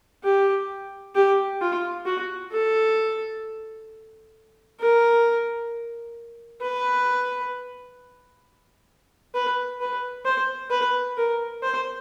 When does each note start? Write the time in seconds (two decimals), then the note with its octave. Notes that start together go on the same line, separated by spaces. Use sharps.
0.24 G4
1.15 G4
1.61 F4
2.06 F#4
2.52 A4
4.80 A#4
6.61 B4
9.34 B4
9.81 B4
10.25 C5
10.71 B4
11.17 A#4
11.62 C5